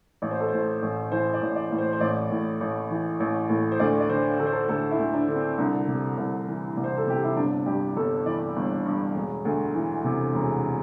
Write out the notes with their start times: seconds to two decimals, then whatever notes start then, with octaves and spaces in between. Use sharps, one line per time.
0.22 A1 D5
0.31 C5
0.40 A4
0.48 A2 C5
0.82 A1
1.12 E3 C5
1.34 D5
1.41 A1
1.56 D5
1.71 A2
1.78 C5
1.93 C5
2.00 A1 D5
2.31 A2
2.61 A1
2.90 E3
3.20 A1
3.49 A2
3.72 C5
3.79 D2 D5
4.00 D5
4.09 D3 C5
4.39 D3 A4
4.47 C5
4.53 A4
4.69 D2 A4
4.91 E4
4.99 D2
5.14 D4
5.28 D3
5.36 C4
5.58 C2 D4
5.87 C3
6.17 C2
6.48 E3
6.77 C2
6.84 C5
6.97 A4
7.06 C3 G4
7.24 E4
7.36 G1 D4
7.66 G2 G4
7.96 G1 A4
8.26 E3 D5
8.56 G1
8.86 G2
9.15 E1
9.45 D2
9.75 E3
10.04 C3
10.34 E1